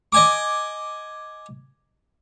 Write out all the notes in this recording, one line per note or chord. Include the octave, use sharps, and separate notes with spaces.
D#5 G#5 D6